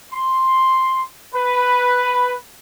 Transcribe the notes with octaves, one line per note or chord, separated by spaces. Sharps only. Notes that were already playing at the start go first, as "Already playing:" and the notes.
C6
B4